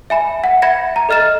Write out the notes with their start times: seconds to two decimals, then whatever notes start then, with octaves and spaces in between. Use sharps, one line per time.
0.10 E5 G#5 B5
0.44 F#5
0.62 E5 B5 G#6 A#6 C#7
0.96 A#5
1.09 A4 D#5 F6 A6 E7